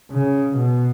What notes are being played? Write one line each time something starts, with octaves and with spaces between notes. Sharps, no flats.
C#3
B2